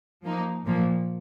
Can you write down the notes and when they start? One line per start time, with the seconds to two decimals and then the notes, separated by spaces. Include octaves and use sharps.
0.24 F3 A#3 D#4
0.65 A#2 F3 A#3